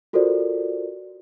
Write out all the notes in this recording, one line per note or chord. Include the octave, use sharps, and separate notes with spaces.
F4 F#4 A4 A#4 C5 D5